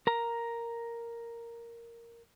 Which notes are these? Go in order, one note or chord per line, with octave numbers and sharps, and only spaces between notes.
A#4 A#5